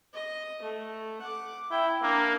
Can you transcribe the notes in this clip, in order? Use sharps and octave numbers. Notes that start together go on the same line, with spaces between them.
D#5
A3
F#5 D6
E4 G5
A#3 D4 A#4